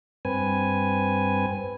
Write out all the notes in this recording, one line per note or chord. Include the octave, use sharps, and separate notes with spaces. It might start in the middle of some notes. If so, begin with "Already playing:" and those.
G2 C4 B4 G#5